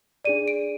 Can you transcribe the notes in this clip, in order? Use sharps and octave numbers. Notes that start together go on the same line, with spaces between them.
D4 G#4 D5 D#7
D7